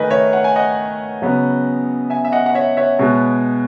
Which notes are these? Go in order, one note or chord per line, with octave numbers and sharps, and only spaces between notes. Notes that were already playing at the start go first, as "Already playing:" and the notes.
Already playing: D#3 A3 B4 D#5 G#5
C#5 E5
F#5
G#5
D#5 F#5
C#3 F#3 B3
E5 G#5
E5
D#5 F#5
F#5
C#5 E5
C#5 E5
B2 G#3 B3